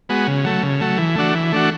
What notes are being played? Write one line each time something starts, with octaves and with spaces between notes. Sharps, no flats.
G#3 B3 F#4
C#3
F#3 A3
C#3
F#3 A3
E3
A3 D4 F#4
E3
A3 D4 F#4